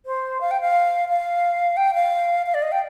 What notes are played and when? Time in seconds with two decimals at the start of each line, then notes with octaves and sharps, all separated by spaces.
0.06 C5
0.41 F5
0.51 G5
0.61 F5
1.09 F5
1.77 G5
1.94 F5
2.46 F5
2.54 D5
2.62 D#5
2.72 G5